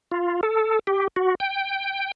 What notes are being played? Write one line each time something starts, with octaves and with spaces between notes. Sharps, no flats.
F4
A4
G4
F#4
G5